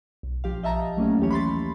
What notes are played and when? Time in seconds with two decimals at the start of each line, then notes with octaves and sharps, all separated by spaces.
0.23 B1
0.44 A#1 F3 G4 F5
0.63 D#5 E5 A5 A#5
0.97 F#3 A3 A#3 C#4
1.19 D#2 E3 G4 C#5
1.31 B5 C6 A6